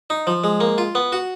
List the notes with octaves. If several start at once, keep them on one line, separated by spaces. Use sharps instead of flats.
D#4
F3
G#3
A#3
F4
B3
F#4